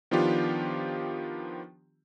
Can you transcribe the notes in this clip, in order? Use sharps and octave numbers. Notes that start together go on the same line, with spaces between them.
D#3 F3 B3 D4 F4 G4